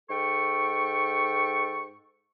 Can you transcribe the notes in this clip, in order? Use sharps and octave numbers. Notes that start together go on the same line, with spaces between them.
G#2 A4 G5 C#6